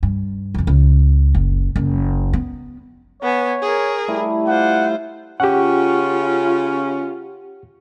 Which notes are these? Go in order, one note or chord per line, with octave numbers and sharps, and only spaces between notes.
G2
B1 F2
C#2
F#1
F#1
B3
B3 C#5 G#5
G#4 A#4
G3 A3 E4
F4 C5 F#5 D6
C#3 C#4 F4 G4 F#5